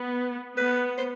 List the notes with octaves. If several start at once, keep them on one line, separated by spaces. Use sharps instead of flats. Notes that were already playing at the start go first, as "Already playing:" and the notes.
Already playing: B3
B3 B4
C5